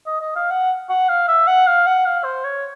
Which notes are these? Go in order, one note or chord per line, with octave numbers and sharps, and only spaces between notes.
D#5
D#5
F5
F#5
F#5
F5
E5
F#5
F5
F#5
F5
C5
C#5